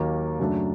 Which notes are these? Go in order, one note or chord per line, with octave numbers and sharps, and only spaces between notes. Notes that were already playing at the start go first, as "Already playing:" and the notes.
Already playing: D#2 D#3 F#3 A#3 D#4
F#2 C#3 F#3 A3 D4